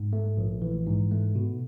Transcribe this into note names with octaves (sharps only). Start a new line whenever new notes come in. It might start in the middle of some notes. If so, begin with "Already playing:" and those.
Already playing: G#2
A3
A#1
E3
G#2
A3
B2